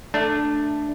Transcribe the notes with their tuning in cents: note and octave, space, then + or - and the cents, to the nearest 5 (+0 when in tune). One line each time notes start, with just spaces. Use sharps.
A3 +0 D4 +5